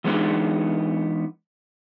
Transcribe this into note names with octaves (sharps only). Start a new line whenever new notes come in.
E3 G#3 B3 C4 D4 D#4